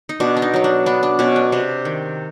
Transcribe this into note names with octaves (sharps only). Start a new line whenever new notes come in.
D#4
B2 D4
D4
D#4
F#3 D#4
D4
B3 D4
D4
B2 C#4
D4
C3 D4
D#3